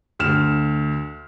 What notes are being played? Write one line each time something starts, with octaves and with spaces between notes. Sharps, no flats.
D2 F6 E7